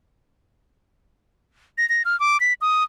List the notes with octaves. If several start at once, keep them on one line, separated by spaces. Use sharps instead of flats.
A#6
A#6
F6
D6
B6
D#6